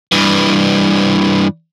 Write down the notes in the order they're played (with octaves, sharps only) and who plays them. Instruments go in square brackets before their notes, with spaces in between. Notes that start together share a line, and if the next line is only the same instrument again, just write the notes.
[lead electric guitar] G2 E3